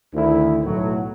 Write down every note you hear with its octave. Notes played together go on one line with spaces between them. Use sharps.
D2 D#3 E4
B1 A2 F#3 F#4